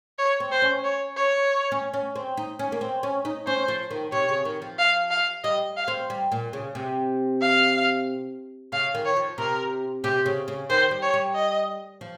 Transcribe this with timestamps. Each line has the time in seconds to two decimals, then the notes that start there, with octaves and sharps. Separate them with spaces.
0.19 C#5
0.40 C4
0.51 C5
0.62 C#4
0.84 C#5
1.17 C#5
1.72 C#4
1.94 C#4
2.16 C4
2.37 D#4
2.59 C#4
2.72 A#3
2.81 C4
3.03 C#4
3.25 D#4
3.47 C#4 C5
3.68 F3
3.91 D#3
4.12 C3 C#5
4.29 C#3
4.45 D#3
4.62 F3
4.78 F5
5.10 F5
5.44 G3 D#5
5.77 F5
5.88 C4
6.10 G3
6.32 A#2
6.53 C#3
6.75 C3
7.41 F5
8.72 C#3 F5
8.95 D#3
9.05 C#5
9.17 F3
9.38 C3 A#4
10.04 C3 G4
10.26 C#3
10.48 C#3
10.70 D#3 C5
10.91 G3
11.02 C#5
11.14 G3
11.35 D#5
12.01 F3